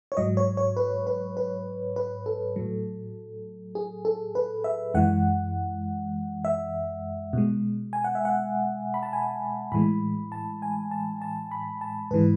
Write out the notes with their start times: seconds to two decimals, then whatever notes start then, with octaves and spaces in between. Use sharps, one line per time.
0.12 C#5
0.17 G#2 F#3 D#5
0.37 C#5
0.57 C#5
0.77 B4
1.07 B4
1.37 B4
1.96 B4
2.26 A4
2.56 A2 F#3
3.75 G#4
4.05 A4
4.35 B4
4.64 E5
4.94 F#2 E3 G#3 F#5
6.45 E5
7.33 B2 G#3
7.93 G#5
8.04 F#5
8.15 E5
8.25 F#5
8.94 B5
9.03 A5
9.13 G#5
9.72 A2 E3 G#3 B5
10.32 A5
10.62 G#5
10.91 A5
11.22 A5
11.51 B5
11.81 A5
12.11 G#2 E3 G#3 B4